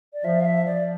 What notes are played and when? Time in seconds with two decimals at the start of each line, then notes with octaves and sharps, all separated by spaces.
0.13 D5
0.24 F3 E5
0.40 F5
0.46 E5
0.66 F3 D5